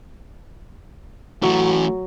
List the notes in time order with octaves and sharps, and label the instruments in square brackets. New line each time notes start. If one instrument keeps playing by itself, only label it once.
[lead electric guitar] E3 A3 [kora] F#3